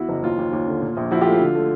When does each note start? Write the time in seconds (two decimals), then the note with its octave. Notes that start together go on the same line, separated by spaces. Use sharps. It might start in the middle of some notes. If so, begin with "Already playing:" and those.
Already playing: E2 E4 F#4
0.09 F#1
0.23 D#2 F4
0.39 D#2
0.53 D#2
0.67 D3
0.81 A#2
0.97 A#1
1.11 F3 E4 F#4
1.21 A3 F4 G4
1.31 F4
1.40 D3
1.55 A3